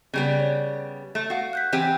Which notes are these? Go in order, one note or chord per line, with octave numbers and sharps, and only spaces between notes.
C#3 G3 B3
C#5
A3
F#4 F5 F#5
F#6 G6 B6
E3 C4 G4